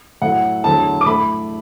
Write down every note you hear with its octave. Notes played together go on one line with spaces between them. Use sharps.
A2 F#3 A3 F#5
E2 D3 F#3 A3 A5
D6
A2 A3 B5